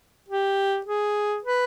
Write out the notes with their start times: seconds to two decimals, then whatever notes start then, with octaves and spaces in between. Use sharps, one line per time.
0.28 G4
0.86 G#4
1.44 B4